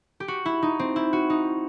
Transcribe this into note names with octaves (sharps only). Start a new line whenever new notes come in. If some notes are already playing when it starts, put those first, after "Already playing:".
G4
F#4
E4
D#4
C4
E4
F#4
D#4